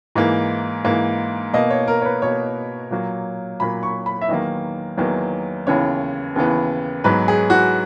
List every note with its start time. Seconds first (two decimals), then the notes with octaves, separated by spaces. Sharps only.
0.15 G#2 E3 A#3
0.84 G#2 E3 A#3
1.53 B2 A#3 D#5
1.70 C#5
1.88 A#4
2.01 C#5
2.05 B4
2.22 B2 A#3 C#5
2.91 A#2 F#3 A#3
3.60 A#2 F#3 A#3 B5
3.83 C#6
4.06 B5
4.21 E5
4.29 E2 D#3 F#3 A#3 D#5
4.97 E2 D#3 F#3 A#3
5.67 D#2 C#3 E3 B3 C#5
6.36 D#2 C#3 E3 B3
7.04 G#2 F#3 B3 B4
7.28 G#4
7.50 F#4